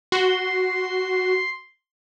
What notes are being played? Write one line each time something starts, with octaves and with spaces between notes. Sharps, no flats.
F#4 C6